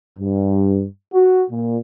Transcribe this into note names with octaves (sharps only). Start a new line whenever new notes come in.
G2
F#4
A#2